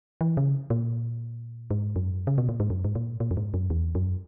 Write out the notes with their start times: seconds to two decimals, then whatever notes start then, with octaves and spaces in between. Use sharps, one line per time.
0.21 E3
0.37 C#3
0.70 A#2
1.71 G#2
1.96 F#2
2.27 C#3
2.38 B2
2.49 A#2
2.60 G#2
2.70 F#2
2.84 G#2
2.95 A#2
3.20 A#2
3.31 F#2
3.37 G#2
3.54 F#2
3.70 E2
3.95 F#2